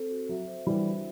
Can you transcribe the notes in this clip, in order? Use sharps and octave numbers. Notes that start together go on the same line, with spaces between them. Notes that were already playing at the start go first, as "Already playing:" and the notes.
Already playing: C4 A4 C5
F#4
F#3 E5
C5
E3 G3 D4
F#4